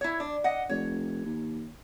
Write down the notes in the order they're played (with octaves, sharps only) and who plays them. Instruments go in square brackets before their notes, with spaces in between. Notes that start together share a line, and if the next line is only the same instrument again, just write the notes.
[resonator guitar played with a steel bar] E4 C#5
D4
D#5 F#5
[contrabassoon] F1 [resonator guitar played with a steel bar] C#5
[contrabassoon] D#2